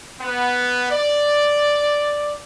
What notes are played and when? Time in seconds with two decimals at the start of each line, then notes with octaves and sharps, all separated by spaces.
0.20 B3
0.91 D5